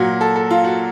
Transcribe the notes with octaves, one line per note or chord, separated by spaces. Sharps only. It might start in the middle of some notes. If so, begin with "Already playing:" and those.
Already playing: A#2 F#3 F#4
A4
A4
F4
F#4